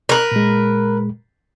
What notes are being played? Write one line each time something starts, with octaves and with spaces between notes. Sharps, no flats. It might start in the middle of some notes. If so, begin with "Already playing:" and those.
A#4 B4
A#2 G#3